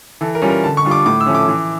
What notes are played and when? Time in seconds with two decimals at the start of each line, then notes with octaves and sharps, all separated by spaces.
0.21 E3 A4
0.35 A#4
0.42 G3 C#4 F4
0.49 A#4
0.63 D3 A5
0.77 C#6
0.85 G3 D4 F4
0.91 D6
1.06 A2 D6
1.20 E6
1.26 F3 A3 C#4
1.35 D6
1.48 E3